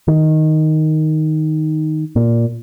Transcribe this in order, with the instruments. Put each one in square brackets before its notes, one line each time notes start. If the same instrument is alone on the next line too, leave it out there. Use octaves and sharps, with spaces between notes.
[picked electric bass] D#3
A#2